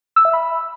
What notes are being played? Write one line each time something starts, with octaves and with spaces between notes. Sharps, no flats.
E6
E5
B5